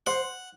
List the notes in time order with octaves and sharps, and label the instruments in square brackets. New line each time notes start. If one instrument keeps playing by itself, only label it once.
[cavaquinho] C5 [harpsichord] F#5